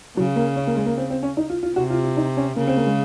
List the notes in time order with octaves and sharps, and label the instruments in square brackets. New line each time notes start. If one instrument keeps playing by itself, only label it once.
[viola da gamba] C#3 [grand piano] F#3
[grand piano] A#3
C#4
A#3
G#3
A#3
C4
C4
C#4
D#4
F4
F4
[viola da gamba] C3 [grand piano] F#4
[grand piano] F4
F4
D#4
C#4
[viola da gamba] C#3 [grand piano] A#3
[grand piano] C4
A#3
G#3